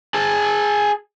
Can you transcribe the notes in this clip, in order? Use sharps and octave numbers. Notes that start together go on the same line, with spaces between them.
G#4 A5